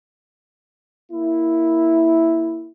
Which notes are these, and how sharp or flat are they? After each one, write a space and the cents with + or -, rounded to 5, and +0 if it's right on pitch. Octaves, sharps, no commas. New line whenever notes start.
A#3 +0 E4 +0